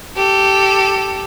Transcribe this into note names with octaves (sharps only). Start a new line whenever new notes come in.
G4 A4